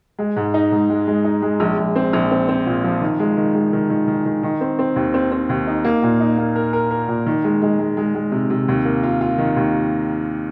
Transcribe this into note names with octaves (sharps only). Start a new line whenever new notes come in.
G#3
G#2
D#4
G#2
G#3
G#3
D#4
G#3
A#1
A#1
C4
A#1
C4
C4
A#2
F3
D#3
G#3
D#3
G#3
D#3
D#3
D#3
D#3
D#3
C4
C4
D#2
C4
C4
D#2
D#4
A#3
A#2
D#4
A#3
A#4
A#4
A#4
A#2
D#3
G#3
G#3
G#3
G#3
G#3
C3
C3
D#2
A#3
F4
F4
D#3
D#2